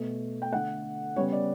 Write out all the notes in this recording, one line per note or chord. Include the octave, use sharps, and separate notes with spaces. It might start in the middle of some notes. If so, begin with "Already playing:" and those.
Already playing: B2 A3
G5
D3 A3 F#5
C#3 G3 B3 C#5
D5